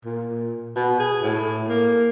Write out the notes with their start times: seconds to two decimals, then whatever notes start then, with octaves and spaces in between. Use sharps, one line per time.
0.05 A#2
0.75 B2
0.99 G#4
1.22 A2
1.69 A#3